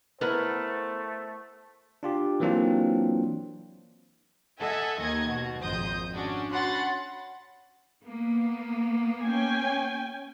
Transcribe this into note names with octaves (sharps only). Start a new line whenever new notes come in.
A3 B3 E4 A#4 C5 F#5
D4 F4 G4
E3 F#3 A#3 C4 D4 F4
A4 D#5 E5 F#5 G#5
D#2 D#3 D#5 G#6
B2 F#4
G#1 F2 C5 D#5 D#6 G6
C#4 D4 F#4
C#4 F#4 F#5 B5 C6 A6
A#3 B3
C#4 G5 G#5